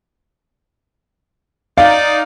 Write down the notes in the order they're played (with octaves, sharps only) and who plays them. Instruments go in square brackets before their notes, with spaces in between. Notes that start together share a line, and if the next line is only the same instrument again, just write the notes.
[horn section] D#4 D5 [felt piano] F5